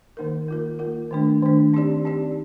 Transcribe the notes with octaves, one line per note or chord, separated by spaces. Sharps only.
D#3 A#3 D#4 A#4
A#3 F4 A#4
A#3 F4 A#4
D#3 A3 D4
D#3 A3 D4
C4 D#4 G4 D5
C4 D#4 G4 D5